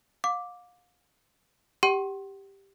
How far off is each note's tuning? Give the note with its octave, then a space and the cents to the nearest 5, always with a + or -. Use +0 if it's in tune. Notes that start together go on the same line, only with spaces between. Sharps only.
F5 +35 D6 +0
G4 +5 F#5 +40 C6 +25